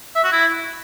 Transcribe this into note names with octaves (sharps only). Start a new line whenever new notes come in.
E5
F#4
E4